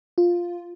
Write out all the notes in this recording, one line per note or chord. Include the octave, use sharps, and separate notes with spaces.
F4